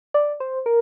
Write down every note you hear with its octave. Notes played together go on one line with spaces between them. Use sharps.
D5
C5
A#4